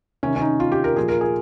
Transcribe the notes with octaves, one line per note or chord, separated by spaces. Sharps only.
C3 D#3 C#4
C#4
D#4
F4
G4
A#4
A#2 F3 G#4
A#4
G#4